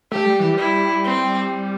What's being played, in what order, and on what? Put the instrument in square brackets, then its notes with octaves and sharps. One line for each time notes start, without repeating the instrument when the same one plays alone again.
[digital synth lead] A3 [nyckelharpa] G4
[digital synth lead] G3
E3
[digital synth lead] G3 [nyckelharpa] E4
[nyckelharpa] C4